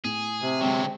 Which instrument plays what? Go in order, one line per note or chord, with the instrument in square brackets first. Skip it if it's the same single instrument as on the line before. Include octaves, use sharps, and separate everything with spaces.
[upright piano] A2 [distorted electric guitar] G#4
[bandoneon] C3
[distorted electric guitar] D3 F#3 [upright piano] G#3 C4 [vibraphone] G5